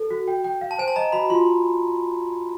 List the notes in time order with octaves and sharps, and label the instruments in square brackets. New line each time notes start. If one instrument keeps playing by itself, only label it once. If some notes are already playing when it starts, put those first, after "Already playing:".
Already playing: [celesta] A4
F#4
G5
G5
F5
[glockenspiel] A5
[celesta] C5 [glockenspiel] G#5
[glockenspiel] A5
[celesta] D#5 [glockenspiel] A#5
[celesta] F#4 [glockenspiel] B5
[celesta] F4 [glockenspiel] C6